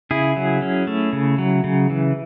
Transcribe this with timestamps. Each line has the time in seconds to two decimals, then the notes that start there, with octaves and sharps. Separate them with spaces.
0.11 C#3 E4 G#4
0.36 F#3
0.62 C#4
0.87 A3
1.13 C#3
1.38 F#3
1.64 C#3
1.90 E3